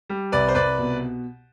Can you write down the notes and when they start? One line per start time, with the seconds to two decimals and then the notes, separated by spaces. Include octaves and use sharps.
0.09 G3
0.32 C2 B4 D5
0.48 C5
0.55 C2 B4 D5
0.79 B2